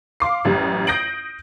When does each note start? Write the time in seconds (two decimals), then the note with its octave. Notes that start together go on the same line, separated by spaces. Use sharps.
0.20 F5 C6 D6 C7
0.45 A1 F#2 G3
0.87 D#6 G6 A#6 C7 D7 F#7